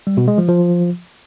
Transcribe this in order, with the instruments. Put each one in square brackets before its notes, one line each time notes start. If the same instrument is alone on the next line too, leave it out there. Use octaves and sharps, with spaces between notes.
[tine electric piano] G3
B2
G#3
F3
F3